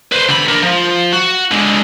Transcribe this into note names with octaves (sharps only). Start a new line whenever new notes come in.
B4 C5
D3 B5
D4 A#4
F3
F#4
D3 G#3